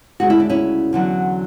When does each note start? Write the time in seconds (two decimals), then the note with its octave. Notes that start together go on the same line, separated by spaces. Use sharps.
0.20 D2 C#3 G#3 F#4
0.30 E4
0.40 D4
0.49 C#4 E4
0.93 E2 D3 F#3